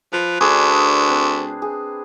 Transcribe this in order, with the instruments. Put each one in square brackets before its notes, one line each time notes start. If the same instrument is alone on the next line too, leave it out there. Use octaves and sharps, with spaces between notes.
[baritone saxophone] F3 [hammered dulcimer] B4
[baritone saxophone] D2 [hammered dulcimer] D4 G#4
[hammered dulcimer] C4
G#4